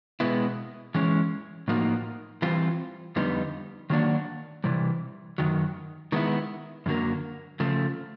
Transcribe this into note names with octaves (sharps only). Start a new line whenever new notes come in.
B2 G#3 B3 E4
E3 G#3 C#4
A2 F3 A#3 D#4 F#4
E3 G3 C4 F4
F2 D3 G3 B3 D#4
D#3 F#3 A#3 D4 F#4
C3 E3 G3
F#2 D#3 F#3
D#3 G#3 B3 E4
F#2 D3 F#3 A#3
C#3 F3 A3